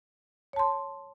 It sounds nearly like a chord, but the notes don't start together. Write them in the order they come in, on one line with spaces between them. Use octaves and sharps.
C#5 A5 C6